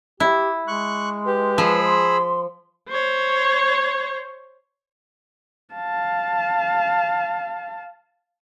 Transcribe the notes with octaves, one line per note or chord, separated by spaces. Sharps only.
E4 G4
G#3 C#6 F#6
G4 B4
F3 G#4 B5 E6
C6
C5 C#5
F5 A5